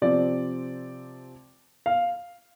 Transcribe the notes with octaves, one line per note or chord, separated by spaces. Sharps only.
C3 F3 C4 D5
F5